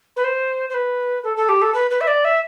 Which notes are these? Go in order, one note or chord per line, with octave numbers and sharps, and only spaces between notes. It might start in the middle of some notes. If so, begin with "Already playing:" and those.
B4
C5
C5
B4
A4
A4
G4
A4
B4
B4
E5
D5
E5